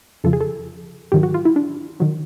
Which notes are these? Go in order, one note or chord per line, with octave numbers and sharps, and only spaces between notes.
F2 C#3 F3 A4
G#4
A4
G#2 D#3 F#3 G4
F#4
F4
E4
D4
D#3 F#3